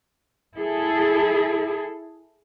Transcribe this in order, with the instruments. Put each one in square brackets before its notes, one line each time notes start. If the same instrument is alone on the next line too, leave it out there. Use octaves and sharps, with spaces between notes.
[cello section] E4 G#4 A4